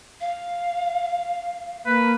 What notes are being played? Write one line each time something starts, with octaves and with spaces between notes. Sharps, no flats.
F5
A#3 B4